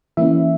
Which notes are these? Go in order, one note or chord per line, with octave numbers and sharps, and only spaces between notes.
E3 A#3 C#4 E4 E5